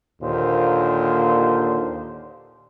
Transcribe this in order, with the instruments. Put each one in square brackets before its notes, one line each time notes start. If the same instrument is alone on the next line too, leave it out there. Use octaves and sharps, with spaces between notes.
[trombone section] D#2 A#2 D3 C5